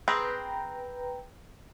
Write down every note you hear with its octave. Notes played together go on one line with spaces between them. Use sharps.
C4 G#4 B4 G5 A#5